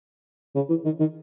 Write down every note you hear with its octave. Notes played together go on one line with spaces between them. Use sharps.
C#3
E3
D#3
D#3